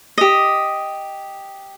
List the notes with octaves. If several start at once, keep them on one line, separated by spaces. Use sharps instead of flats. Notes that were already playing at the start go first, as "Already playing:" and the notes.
G4 D#5